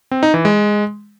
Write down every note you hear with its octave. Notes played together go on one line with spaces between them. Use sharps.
C4
D#4
E3
G#3